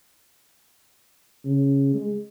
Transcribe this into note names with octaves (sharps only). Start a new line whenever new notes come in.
C#3
G#3